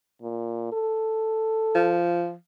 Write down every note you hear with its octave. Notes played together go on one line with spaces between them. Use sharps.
A#2
A4
F3